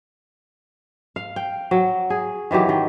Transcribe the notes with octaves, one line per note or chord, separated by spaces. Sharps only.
F5
G5
F#3
G#4
D#3 E3 F#3 G4
D#3